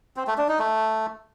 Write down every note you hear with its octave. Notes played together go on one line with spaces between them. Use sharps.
C4
A3
D4
D#4
A3